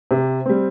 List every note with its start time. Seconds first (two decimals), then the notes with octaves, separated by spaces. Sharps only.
0.11 C3
0.46 G3 C4